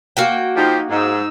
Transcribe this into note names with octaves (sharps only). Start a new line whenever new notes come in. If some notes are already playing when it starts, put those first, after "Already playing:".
A#3 F#4 G5
F3 D#4 G4
G#2 D#4 E6